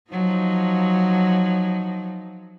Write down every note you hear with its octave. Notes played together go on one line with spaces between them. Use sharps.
F3 F#3 D#4